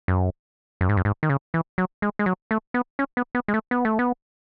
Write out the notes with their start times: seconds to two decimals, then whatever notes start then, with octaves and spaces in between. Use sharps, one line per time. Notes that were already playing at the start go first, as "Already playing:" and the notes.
0.08 F#2
0.81 F#2
0.89 G#2
0.97 F#2
1.05 G#2
1.23 D#3
1.30 C#3
1.54 E3
1.78 F#3
2.02 G#3
2.19 G#3
2.26 F#3
2.51 A3
2.74 B3
2.99 C#4
3.17 B3
3.35 B3
3.48 G#3
3.54 A3
3.71 B3
3.85 A3
3.99 B3